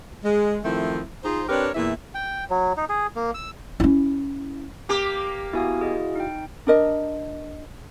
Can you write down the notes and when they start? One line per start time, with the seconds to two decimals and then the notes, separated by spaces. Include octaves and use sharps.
0.24 G#3
0.64 D#3 F3 A3 C4 E4
1.24 D#4 F4 G#4 C5
1.49 C4 D4 G4 A#4 B4 C#5
1.75 E2 A#2 E3 E5
2.14 G5
2.50 F#3
2.77 D#4
2.89 G#4
3.16 A#3
3.34 E6
3.80 C#4 E4
4.89 A#3 G4 D6
5.53 B3 E4 F#4 F5 G#5 D#6
5.81 G#4 D#5
6.16 D#4 G5
6.67 D4 A#4 D#5